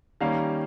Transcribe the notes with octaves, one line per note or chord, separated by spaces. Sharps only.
D#3 G3 A#3 C#4 F5